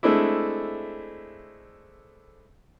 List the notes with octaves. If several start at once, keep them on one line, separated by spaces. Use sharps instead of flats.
G#3 A3 C4 D4 E4